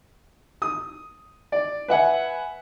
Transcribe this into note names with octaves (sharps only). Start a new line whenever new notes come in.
D#6
D5
B4 E5 F#5 G#5